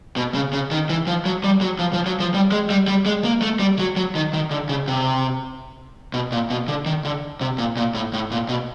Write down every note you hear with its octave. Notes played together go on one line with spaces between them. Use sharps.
B2
C#3
C#3
D#3
E3
F3
F#3
G3
F#3
F3
F3
F#3
F3
G3
G#3
G3
G3
G#3
A#3
A3
G3
F#3
F#3
D#3
D#3
D3
C#3
C3
B2
A#2
B2
D3
D#3
D3
C3
A#2
A#2
A2
A2
A#2
B2